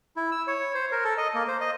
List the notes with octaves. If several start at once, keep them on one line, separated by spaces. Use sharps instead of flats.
E4
E6
C#5
C5
A#4
A4
D#5
A#3
C5
D#5